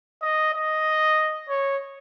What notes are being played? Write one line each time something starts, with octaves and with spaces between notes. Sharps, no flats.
D#5
D#5
C#5